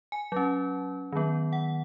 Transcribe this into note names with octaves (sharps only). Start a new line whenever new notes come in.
G#5
F#3 C#4
D#3 F#3 B3
F#5